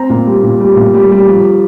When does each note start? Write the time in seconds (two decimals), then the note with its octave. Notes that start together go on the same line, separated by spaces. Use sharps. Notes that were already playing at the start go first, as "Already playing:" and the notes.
Already playing: C4 A#5
0.10 A#2
0.26 G3
0.43 A#2
0.60 G3
0.76 A#2
0.94 G3
1.11 G3
1.27 F3